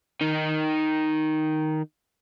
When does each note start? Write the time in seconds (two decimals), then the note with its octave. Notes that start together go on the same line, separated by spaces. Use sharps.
0.21 D#3 D#4